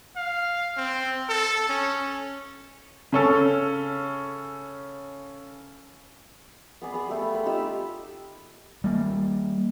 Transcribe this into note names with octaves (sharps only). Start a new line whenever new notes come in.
F5
C4
A4
C#4
C#3 C#4 A4
B3 G#4 D5 B5
B3 G#4
G3 A3
F5
C5 B5
D#4 F4 G4 E6
G3 A#3